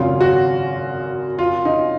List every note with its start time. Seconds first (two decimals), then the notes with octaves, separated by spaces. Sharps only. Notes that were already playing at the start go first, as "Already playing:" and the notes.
Already playing: G#1 F#2 C#3 F4
0.21 F#4
1.39 F4
1.65 D#4